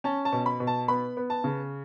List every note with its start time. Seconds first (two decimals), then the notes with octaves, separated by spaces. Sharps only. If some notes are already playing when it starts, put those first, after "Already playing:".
0.04 C#4 A5
0.25 A5
0.32 B2
0.46 B5
0.60 B2
0.67 A5
0.88 B3 B5
1.17 B3
1.30 A5
1.44 C#3